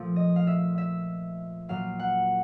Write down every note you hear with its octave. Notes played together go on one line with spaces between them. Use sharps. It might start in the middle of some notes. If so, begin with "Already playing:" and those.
Already playing: A#2 F3 A3
D#5
F5
E5
E5
A#2 F#3 A#3 F5
F#5